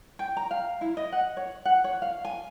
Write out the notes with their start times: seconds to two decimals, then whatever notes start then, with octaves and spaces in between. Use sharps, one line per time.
0.19 G5
0.37 A#5
0.51 F5
0.81 E4
0.97 D#5
1.12 F#5
1.37 C#5
1.65 F#5
1.84 C#5
2.02 F5
2.25 G#5